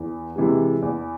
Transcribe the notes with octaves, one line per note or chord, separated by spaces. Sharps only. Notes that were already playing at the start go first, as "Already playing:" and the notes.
Already playing: E2
C3 E3 G#3
E2